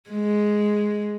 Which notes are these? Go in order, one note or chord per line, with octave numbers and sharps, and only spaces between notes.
G#3